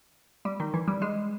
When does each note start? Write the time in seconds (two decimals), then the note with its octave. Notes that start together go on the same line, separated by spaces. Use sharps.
0.45 G3
0.60 D#3
0.74 E3
0.88 G3
1.02 G#3